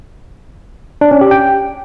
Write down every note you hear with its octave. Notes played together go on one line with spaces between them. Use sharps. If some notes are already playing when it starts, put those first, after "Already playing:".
D4
C#4
G4
G5